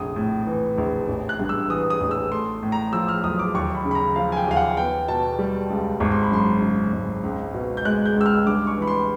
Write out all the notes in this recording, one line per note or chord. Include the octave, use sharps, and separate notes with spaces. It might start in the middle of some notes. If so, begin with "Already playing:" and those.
Already playing: F1 A#1 D#6
A2
E3
A#1
A1
F#6
G2
E6
E3 D#6
D#6
A1
E6
A3 C6
A2
A#5
F3 E6
F6
B1 D#6
D6
D#2 C#6
B5
C#3
B5
A#5
F3 F5
G#5
G5
D#2 F5
F#5
B3 G5
B2 A5
G3
C#2
G#1 C#6
C6
B5
F#2 C6
C#3
G#1
C#2
B2
G6
G#3 F#6
G6
C#2 E6
F6
G2 D6
C#6
E3 B5
C6